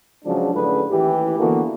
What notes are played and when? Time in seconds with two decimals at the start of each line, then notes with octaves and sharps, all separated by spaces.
0.25 C#3 F3 F#3 G#3 D4
0.54 F#2 A2 D3 D4 G#4 B4
0.90 A1 D#2 E3 G4
1.39 D3 E3 A#3 B3 F#4 A4